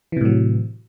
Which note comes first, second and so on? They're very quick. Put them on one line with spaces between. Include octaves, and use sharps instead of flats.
E3 C3 A2 F#3